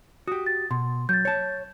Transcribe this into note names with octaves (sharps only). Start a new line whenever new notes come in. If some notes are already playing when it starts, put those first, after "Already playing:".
F#4 G4 D#6
A6
B2 C6
F#3 G6 A6
C#5 A5